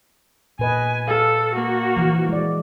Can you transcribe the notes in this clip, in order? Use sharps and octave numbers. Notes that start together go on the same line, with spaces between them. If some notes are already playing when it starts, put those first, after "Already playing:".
A#2 B4 D#5 G#5
A4 F5
A#3 F#4
E3 F3
G#3 D5